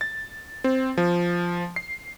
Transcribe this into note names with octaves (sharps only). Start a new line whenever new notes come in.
A6
C4
F3
C7